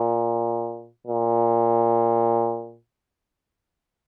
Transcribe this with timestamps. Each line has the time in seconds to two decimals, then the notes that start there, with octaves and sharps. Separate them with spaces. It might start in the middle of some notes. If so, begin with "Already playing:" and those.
Already playing: A#2
1.07 A#2